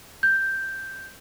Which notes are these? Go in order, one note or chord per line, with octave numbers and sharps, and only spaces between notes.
G6